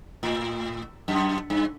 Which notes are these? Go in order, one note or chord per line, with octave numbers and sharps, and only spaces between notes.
A2
F#2
G2